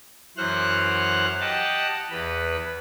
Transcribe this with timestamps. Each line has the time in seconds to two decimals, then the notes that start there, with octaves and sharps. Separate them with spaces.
0.37 F#2 E3 C5 F#5 F6 F#6
1.40 G4 D#5 F#5 A5
2.11 E2 B4